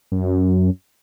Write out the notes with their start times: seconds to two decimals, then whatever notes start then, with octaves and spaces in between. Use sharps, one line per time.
0.12 F#2